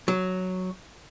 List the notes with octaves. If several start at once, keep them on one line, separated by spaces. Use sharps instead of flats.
F#3